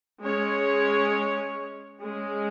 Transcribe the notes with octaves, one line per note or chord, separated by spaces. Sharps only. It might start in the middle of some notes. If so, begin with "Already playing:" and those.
G#3 C#4 G#4 C#5
G#3 C#4 G#4